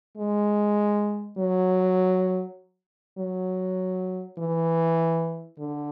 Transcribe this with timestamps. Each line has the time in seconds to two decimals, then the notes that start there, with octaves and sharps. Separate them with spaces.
0.17 G#3
1.38 F#3
3.18 F#3
4.38 E3
5.58 D3